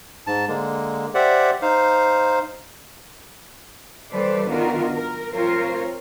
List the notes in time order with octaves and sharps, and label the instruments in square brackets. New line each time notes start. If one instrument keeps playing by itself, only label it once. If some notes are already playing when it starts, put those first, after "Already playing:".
[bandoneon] G#2 A5
D3 G#3 A#3
G4 C5 D5 E5 F#5
D#4 C5 F5
[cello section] E3 G3 A4 B4 C5 D5
D#3 B3 D4 F4 F#4 A#4
A#4
F3 C4 F4 A#4 C5 C#5